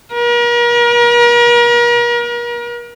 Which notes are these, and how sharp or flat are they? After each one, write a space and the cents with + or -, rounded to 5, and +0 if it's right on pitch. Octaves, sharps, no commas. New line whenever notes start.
A#4 +40